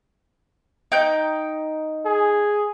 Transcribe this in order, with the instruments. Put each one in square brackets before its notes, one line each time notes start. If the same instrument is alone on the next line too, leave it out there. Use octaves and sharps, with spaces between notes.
[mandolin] D#4 G5 G6
[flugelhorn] G#4